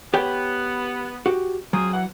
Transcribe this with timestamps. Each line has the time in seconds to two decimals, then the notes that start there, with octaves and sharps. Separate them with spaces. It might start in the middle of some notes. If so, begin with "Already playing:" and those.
0.14 B3 G4 C#5 G5
1.26 F#4 G4
1.73 F#3 C4 F4 G#4
1.94 E3 F#5